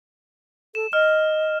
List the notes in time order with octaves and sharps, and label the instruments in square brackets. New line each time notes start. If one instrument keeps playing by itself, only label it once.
[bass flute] A4 [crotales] E7
[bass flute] D#5 [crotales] F6